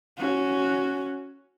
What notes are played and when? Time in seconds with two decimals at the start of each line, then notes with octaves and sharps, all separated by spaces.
0.18 C#4 F#4